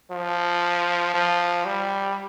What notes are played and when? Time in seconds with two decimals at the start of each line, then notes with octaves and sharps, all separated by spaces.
0.11 F3
1.14 F3
1.65 G3